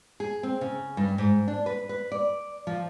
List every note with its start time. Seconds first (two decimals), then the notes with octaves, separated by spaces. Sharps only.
0.20 G#4
0.43 C4
0.61 C#3
0.97 G2
1.18 G#2
1.48 D4
1.66 B4
1.89 B4
2.12 D5
2.67 F3